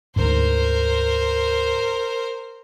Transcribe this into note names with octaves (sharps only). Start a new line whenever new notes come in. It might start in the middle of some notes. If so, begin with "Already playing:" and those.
D2 G#2 A#4 C5